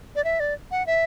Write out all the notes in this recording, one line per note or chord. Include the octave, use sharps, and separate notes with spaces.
D5
E5
D5
F#5
E5